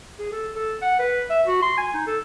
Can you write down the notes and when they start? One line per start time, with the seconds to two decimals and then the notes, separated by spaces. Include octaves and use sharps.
0.19 G#4
0.32 A4
0.56 A4
0.82 F#5
0.99 B4
1.30 E5
1.47 F#4
1.62 C6
1.77 G#5
1.94 D#4
2.07 A4